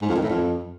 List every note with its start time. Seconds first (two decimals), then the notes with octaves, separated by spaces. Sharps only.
0.02 G#2
0.09 F2
0.16 D#3
0.23 A2
0.30 F2